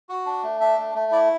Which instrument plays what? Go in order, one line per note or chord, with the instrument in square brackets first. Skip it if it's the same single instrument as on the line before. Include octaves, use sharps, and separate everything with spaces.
[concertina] F#4
D4
A3
D4 E5
A3
A3
E4 D5